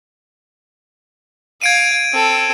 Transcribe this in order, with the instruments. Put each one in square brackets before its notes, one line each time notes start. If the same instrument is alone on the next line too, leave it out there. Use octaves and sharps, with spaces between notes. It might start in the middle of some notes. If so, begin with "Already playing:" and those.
[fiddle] F5 [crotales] G#6 D7 D#7
[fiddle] C4 A4